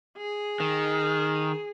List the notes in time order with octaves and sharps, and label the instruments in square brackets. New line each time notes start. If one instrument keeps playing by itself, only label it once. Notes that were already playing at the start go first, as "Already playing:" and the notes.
[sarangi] G#4
[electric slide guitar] D#3